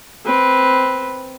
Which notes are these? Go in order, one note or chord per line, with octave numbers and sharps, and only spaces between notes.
C4 B4